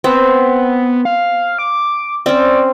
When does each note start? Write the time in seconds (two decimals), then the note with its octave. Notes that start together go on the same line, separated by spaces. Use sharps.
0.04 B3 C4
1.05 F5
1.58 D6
2.26 C4 C#4 D5